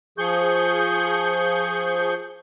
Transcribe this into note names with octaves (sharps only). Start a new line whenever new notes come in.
F3 G#4 C#6 G6